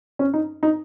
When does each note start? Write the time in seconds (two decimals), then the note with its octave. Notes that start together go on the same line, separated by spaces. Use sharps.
0.19 C#4
0.34 D#4
0.63 D#4